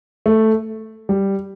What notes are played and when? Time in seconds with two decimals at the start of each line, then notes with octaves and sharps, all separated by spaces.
0.26 A3
1.09 G3